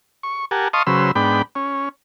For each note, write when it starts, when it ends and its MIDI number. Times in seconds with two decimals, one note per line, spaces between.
0.23 0.45 85
0.51 0.68 67
0.51 0.68 70
0.51 0.68 78
0.51 0.68 80
0.51 0.68 81
0.73 0.83 75
0.73 0.83 77
0.73 0.83 81
0.73 0.83 84
0.73 0.83 85
0.73 0.83 87
0.87 1.11 49
0.87 1.11 54
0.87 1.11 71
0.87 1.11 72
0.87 1.11 88
1.15 1.42 44
1.15 1.42 59
1.15 1.42 62
1.15 1.42 79
1.15 1.42 83
1.55 1.89 61